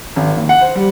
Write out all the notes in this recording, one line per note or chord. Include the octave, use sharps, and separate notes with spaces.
G#1
D#2
F#5
C5
G3